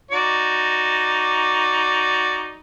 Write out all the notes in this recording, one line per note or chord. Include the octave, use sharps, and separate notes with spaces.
D#4 F#4 D5